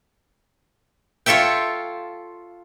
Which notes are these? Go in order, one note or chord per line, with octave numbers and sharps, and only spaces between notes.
F4 A4 C#5 E5 G5